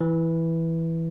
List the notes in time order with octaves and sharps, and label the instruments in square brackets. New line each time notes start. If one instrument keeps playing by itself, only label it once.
[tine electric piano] E3